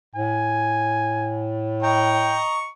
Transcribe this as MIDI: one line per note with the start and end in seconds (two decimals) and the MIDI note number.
0.15 2.43 45
0.15 1.53 80
1.83 2.67 75
1.83 2.41 79
1.83 2.67 82
1.83 2.67 85